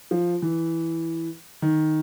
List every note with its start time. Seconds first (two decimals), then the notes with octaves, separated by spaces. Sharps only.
0.11 F3
0.42 E3
1.62 D#3